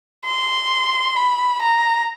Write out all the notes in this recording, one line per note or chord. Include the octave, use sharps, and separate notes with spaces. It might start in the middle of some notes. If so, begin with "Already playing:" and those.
C6
B5
A#5